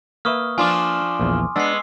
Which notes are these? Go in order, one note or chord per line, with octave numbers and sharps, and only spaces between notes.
A#3 B4 E5 C#6 D#6 F6
F3 D4 F4 G#5 C6 D6
A#1 E2
G#3 B3 D4 E6 C7